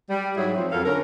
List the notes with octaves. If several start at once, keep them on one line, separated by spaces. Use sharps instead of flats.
G3
G#2 F#3 E4 G#4
F3 C4
F2 F#3 A4 A#4 F5
D3 C#4 A#4